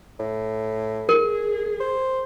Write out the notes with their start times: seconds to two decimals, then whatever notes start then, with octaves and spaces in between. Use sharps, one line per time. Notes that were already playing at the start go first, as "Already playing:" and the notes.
0.19 A2
1.09 G#4 A#4
1.80 C5